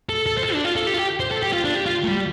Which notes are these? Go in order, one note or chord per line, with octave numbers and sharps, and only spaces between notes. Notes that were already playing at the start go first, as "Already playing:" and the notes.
A4
A4
C5
A4
D4
F4
A4
G4
F4
G4
C5
A4
G4
F4
D4
G4
F4
A3
G3